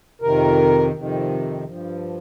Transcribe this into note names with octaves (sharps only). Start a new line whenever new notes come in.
F2 C3 D#3 A#4
F2 C3 D#3
G2 F3